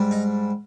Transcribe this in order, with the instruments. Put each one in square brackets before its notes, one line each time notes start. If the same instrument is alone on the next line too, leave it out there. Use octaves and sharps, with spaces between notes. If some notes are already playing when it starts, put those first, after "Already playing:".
Already playing: [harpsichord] G#2 G3
D#4